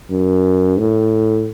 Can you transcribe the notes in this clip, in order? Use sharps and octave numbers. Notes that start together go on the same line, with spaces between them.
F#2
A2